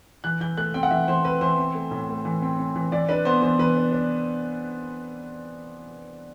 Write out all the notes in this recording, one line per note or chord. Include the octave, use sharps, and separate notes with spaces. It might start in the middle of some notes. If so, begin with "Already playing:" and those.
E3 F#6
E3 G6
A3 F#6
C4 G5
F#5
E3 E5
E3 C5
C4 B4
E3 C5
C4
A3
A2
A3
E3
C4
C4
E3
E3 D5
D4 B4
B3 C5
E3 C5
E3 B4
D4
D4